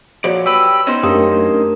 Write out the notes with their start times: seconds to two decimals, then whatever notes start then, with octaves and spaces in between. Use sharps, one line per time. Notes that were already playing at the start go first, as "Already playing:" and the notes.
0.24 A#2 F3 F#4 C#5 D5
0.46 G4 B4 E6
0.87 B3 C#4 D#4 C5
1.03 F#2 A3 A#3 D4 G4 A#4 D#6